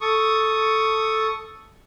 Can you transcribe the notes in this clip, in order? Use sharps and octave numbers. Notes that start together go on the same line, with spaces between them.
A4 C#6 D#6